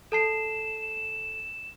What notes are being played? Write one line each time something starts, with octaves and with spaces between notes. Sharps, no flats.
A4 A5 C7 E7